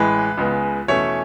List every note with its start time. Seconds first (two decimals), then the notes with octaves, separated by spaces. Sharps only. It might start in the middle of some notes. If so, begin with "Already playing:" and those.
Already playing: A1 A2 E3 G#3 B4
0.37 C#2 C#3 G#3 B3
0.88 E2 B2 A3 C#4 C#5